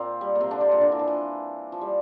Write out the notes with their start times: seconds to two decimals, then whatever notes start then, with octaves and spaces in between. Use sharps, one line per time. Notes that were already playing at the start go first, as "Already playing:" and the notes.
Already playing: A#2 A#3 C4
0.21 G3
0.35 A#3
0.41 C3 C4
0.51 D3 D4
0.61 C3 C4
0.71 A#2 A#3
0.81 D3
0.92 E3
0.99 F3
1.07 E3
1.72 F3
1.81 G3